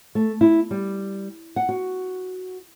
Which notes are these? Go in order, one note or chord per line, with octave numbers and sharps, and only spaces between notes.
A3
E4
G3
F#5
F#4